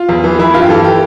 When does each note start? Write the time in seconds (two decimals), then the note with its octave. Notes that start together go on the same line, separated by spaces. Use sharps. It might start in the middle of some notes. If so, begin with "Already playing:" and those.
Already playing: F4
0.09 E2
0.24 E3
0.39 E3 E4
0.54 G2 F4
0.62 G4
0.69 E3 A4
0.84 G4